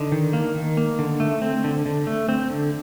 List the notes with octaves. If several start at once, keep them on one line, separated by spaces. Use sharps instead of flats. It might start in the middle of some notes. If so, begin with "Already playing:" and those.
Already playing: D3 D#4
D#3
A#3
D#3
A#3
D3
A3
C4
D3
D3
A3
C4
D3